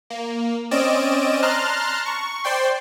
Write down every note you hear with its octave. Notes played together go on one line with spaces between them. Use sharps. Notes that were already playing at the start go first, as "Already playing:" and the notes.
A#3
C4 C#4 D5 D#5 D7 E7
A5 A#5 C6 F6 F#6
C#6
C5 D5 G5 C6